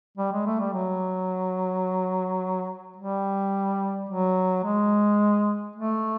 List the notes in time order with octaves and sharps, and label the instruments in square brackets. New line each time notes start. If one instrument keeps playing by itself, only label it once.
[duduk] G3
G#3
A3
G3
F#3
G3
F#3
G#3
A3